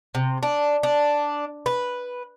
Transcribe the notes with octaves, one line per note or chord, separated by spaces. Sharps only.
C3
D4
D4
B4